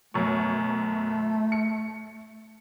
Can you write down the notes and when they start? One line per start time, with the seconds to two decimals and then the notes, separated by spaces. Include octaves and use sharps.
0.14 F#2 B2 A3 C#6
1.52 C#7